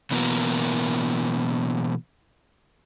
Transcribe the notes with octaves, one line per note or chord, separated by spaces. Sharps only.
B2 E3 F#3 A#3 B3 A#4